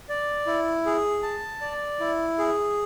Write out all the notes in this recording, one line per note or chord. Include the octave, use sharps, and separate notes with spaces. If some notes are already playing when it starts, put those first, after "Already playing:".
D5
E4
G#4
A5
D5
E4
G#4